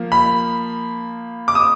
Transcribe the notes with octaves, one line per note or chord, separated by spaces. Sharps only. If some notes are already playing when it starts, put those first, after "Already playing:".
Already playing: F3 A#3
B5
D6
D#6